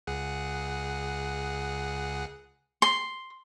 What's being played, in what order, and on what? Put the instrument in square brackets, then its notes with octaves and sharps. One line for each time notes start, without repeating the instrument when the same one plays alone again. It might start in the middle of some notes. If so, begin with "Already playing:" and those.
[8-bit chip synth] C#2 G#4 F#5
[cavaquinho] C6